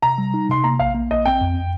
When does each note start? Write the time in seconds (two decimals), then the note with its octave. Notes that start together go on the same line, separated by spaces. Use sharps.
0.02 C3 A#5
0.18 G3
0.34 D#4
0.49 C3 C6
0.64 A#3 A#5
0.80 A#1 F5
0.95 A#3
1.10 A#1 D#5
1.26 C4 G5
1.41 F2